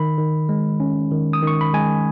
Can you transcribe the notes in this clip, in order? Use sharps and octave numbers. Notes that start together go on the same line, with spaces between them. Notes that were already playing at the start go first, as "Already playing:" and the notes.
Already playing: D#3 B5
D#3
G#3
C#4
D#3
D#6
D#3 C#6
B5
G#3 G#5